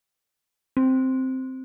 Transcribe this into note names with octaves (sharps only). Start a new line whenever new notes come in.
C4